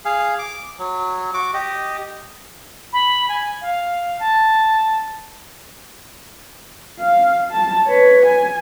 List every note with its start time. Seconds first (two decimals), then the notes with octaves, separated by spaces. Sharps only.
0.05 G#4 F5
0.39 D6
0.79 F#3
1.34 F#4 D6
1.53 G4 D#5
2.93 B5
3.28 G#5
3.61 F5
4.19 A5
7.00 F5
7.52 A5
7.87 B4 C#5
8.26 G#5